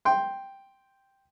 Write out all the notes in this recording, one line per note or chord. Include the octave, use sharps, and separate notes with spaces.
G5 C6